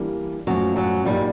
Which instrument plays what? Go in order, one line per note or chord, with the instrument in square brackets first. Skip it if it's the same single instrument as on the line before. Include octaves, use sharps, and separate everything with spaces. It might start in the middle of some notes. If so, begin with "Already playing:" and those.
Already playing: [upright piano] E3 G3 A#3 D4
[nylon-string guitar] F#2 F#3 [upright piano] A#2 F3 A3
[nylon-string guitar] F#2 F#3
[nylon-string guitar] G2 G3 [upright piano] A#2 F#3 A#3 D#4 G4